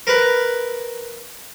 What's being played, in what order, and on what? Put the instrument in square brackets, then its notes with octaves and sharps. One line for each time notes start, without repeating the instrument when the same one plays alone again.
[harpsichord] A#4 B4